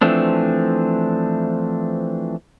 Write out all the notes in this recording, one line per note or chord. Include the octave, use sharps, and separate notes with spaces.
E3 F3 A3 C4 D4